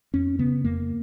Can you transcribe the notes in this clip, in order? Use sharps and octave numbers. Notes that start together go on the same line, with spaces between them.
F2 C#4
C#3 B3
F2 A#3